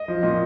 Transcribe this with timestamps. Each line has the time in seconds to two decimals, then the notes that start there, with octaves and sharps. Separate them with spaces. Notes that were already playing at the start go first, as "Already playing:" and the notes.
Already playing: D#5
0.08 F3
0.23 A#2